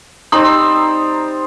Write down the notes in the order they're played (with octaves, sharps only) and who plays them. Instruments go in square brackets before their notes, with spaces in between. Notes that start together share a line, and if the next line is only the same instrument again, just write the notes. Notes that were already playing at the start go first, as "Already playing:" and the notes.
[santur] G3 C4 C5 [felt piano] D#4 [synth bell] A#5 D#6